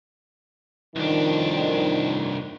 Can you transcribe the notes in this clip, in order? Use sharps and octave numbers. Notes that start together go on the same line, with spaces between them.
C2 F2 A2 D#3 D4